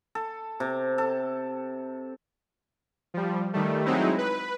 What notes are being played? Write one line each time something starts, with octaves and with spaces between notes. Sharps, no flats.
A4
C3
A4
F3 G3
D#3 G3 A3
F#3 G#3 C4 D#4 E4
B4